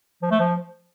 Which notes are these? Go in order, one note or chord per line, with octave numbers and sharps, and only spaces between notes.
F3
A3
F3